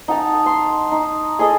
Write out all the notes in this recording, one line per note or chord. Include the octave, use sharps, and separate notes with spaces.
D#4 F#5 A5 A#5
C6
D#4
G#4 A4 D#5